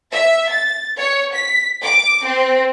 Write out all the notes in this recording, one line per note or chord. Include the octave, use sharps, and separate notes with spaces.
E5
A6
C#5
B6
D6
C4